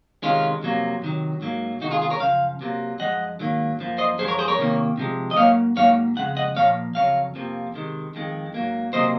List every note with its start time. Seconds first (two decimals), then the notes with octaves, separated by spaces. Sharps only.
0.22 C3 D#3 G#3 C#4 F4
0.62 F2 C3 F#3 A#3
1.02 C3 D#3 F#3
1.42 G#2 F#3 A#3
1.81 C3 D#3 G#3 D#4 F#4
1.91 F4 G#4
2.01 F4 G#4
2.10 A#4 C#5
2.20 F#2 C#3 F3 F5
2.61 C3 F#3 A#3
3.00 F#2 F3 G#3 D#5 F#5
3.40 G#2 D#3 F#3 A#3
3.79 F#2 F3 A#3
3.98 C5 D#5
4.18 F#2 F3 G#3 G#4 C5
4.28 A#4 C#5
4.39 G#4 C5
4.48 A#4 C#5
4.58 C3 D#3 A#3
4.98 C3 F3 G#3
5.31 D#5
5.37 G#2 F#3 A#3 C#5 F5
5.76 G#2 F#3 A#3 C#5 F5
6.16 F2 C#3 G#3 F#5
6.37 D#5 F#5
6.56 A#2 F3 A#3 C#5 F5
6.95 F2 C#3 F#3 C#5 F5
7.35 F2 C3 F3 A#3
7.74 C3 D#3 G#3
8.15 F2 D#3 G#3
8.54 G#2 F#3 A#3
8.93 C3 F#3 A#3 C5 D#5